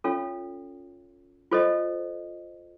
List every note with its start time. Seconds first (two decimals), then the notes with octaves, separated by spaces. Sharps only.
0.04 C#4 F4 A4 C#5 F5
1.51 F4 A4 C5 D#5